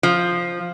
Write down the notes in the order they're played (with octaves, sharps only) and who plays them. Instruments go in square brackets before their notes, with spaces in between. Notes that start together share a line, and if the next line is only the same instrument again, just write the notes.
[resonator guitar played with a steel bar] F3